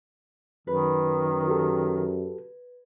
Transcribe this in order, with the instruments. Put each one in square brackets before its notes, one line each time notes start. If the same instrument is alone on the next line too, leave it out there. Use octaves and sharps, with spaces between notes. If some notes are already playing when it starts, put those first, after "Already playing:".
[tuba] F#2 [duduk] D#3 [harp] B4
[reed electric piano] F#4 G4 A4